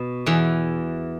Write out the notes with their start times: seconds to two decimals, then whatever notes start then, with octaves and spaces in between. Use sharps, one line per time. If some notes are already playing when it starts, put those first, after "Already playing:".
Already playing: B2
0.26 E2 E3